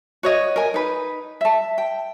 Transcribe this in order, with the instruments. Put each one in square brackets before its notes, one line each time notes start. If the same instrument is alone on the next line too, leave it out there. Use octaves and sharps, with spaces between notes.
[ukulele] F#4 C#5 D#5
A#4 G#5
D#4 B4
E5 A5
G5